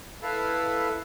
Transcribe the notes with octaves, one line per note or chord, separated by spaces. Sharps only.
E4 A4 B4 F5